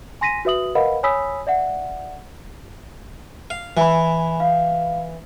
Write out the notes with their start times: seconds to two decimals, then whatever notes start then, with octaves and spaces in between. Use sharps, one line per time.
0.21 G#5 C6 A#6 B6 D#7
0.45 F#4 B4 E5 D#6 F#7
0.75 A#4 B4 D#5 F5 F#5 B5
1.03 C#5 G#5 B5 D#6 E6 B6
1.47 D5 E5 F#5
3.50 F5
3.77 E3 G#5 B5
4.40 F5